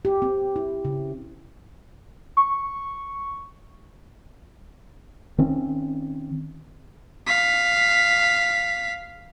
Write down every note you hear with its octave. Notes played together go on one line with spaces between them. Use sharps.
G4
C4
E4
C#3
C#6
D#3 C4 C#4
F5 B6